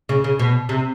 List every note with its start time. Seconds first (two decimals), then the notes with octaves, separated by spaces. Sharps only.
0.09 C#3
0.24 C#3
0.39 B2
0.69 C3